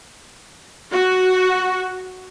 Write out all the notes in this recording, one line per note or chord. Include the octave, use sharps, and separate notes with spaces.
F#4